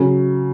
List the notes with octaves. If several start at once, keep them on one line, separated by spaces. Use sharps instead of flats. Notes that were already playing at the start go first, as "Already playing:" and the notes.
Already playing: C#3 F#3